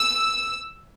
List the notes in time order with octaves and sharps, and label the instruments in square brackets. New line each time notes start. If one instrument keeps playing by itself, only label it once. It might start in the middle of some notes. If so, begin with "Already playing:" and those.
Already playing: [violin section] E6